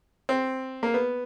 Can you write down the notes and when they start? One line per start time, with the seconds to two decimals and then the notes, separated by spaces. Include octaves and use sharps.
0.29 C4
0.83 A#3
0.94 B3